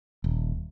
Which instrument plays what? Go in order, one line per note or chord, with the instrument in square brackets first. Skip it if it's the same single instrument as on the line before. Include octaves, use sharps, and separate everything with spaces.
[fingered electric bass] D#1